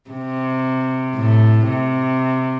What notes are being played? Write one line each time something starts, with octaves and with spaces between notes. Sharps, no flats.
C3
A2
C3